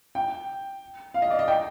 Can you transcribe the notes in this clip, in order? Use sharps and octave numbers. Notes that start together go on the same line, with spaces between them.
G5
F5
D#5
D5
D#5
G5